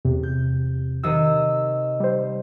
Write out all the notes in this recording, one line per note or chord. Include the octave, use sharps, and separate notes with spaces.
E2 C3
G6
C3 D#3 D#5 E6
G3 C5